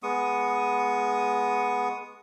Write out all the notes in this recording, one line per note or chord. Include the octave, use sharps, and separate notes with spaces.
G#3 B3 C#6 D#6